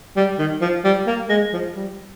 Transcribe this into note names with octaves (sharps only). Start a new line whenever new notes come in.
G3
D#3
F3
G3
A#3
G#3
F3
G3